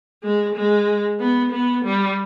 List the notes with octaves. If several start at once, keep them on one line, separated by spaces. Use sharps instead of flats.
G#3
G#3
B3
B3
G3